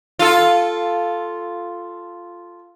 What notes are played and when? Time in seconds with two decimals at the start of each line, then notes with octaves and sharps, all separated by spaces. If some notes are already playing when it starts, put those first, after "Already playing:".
0.19 F4 A4